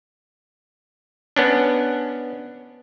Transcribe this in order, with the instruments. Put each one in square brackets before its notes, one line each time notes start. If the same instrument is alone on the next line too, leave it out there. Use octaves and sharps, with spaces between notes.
[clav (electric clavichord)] B3 C#4 D4